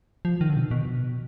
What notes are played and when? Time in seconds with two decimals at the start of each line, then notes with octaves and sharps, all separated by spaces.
0.25 F3
0.41 D#3
0.50 D3
0.57 B2
0.71 B2